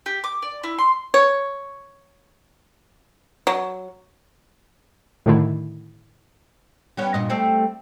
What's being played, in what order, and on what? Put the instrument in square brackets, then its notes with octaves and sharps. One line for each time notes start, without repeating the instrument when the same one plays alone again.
[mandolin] G4
D6
D5
E4
C6
[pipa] C#5
F#3
[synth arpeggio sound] A2 D3 D#3 A3 E4
[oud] G3 B3 C#4
G2 A#2 D#5
G3 A3 C4